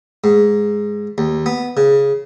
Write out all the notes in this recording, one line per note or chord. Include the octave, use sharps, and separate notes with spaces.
G#2
D#2
B3
C#3